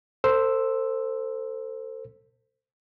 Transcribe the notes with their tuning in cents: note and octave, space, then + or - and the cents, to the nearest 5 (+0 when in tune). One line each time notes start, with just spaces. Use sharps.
A4 +40 C5 +0 E6 +0